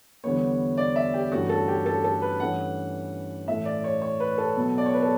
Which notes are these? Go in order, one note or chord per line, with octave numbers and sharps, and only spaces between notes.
E2 D3 G3 B3 C#5
D5
E5
G4
G2 E3 A3 C#4 F#4
A4
G4
A4
A4
B4
G2 E3 A3 C#4 F#5
A2 E3 A3 E5
D5
C#5
C#5
B4
A4
B2 F#3 B3
D5
C#5
B4
A4